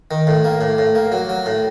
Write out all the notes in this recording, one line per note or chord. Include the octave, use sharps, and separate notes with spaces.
D#3
A2
A#3
A2
A2
A#3
F#3
F#3
A2